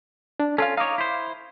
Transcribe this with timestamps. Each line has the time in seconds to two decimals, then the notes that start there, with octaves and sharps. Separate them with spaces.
0.40 D4
0.58 C#4 F4 A4 F5
0.77 D#4 C#5 F5 D6
0.98 E4 C5